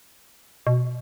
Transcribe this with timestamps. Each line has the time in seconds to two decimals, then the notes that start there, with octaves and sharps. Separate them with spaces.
0.67 B2